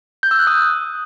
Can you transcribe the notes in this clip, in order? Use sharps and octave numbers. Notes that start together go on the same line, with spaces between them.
G6
E6
F#6
D#6